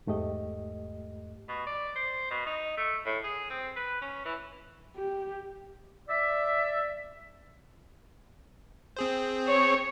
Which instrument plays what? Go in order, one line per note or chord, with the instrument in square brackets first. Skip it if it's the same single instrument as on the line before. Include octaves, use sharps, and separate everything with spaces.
[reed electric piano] E2 G#2 A3 G4 D#5
[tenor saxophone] B2
D5
C5
B2
D#4
A3
A2
G#4
C4
B4
C#4
E3
[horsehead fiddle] G4
[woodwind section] D5 E5
[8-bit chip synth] C4 G#4 C5
[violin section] C#5